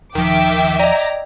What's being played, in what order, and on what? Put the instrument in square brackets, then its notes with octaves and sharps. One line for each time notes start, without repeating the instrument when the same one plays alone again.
[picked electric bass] D#1 F3 [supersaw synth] D#3 [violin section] E5 G5 D6
[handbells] D5 D#5 [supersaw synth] A#5